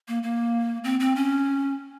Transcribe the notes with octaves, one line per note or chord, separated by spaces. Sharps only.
A#3
A#3
C4
C4
C#4